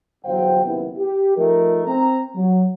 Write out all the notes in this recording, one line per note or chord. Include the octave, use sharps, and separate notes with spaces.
G1 E2 F#3 C5 F5 G5
F#1 D#2 C3 B3 E4
G4
F3 A3 D#4 A#4
C4 A#5
F#3